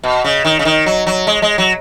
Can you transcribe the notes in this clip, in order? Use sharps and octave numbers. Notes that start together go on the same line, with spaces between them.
B2
C#3
D#3
C#3
D#3
F#3
F#3
G#3
G#3
F#3